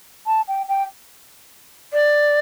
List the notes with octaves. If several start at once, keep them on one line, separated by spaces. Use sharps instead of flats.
A5
G5
G5
D5